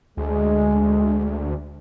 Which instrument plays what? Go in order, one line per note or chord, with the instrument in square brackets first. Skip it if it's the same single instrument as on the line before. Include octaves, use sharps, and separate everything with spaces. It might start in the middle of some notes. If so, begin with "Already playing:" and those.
[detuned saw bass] D2 [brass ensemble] G#3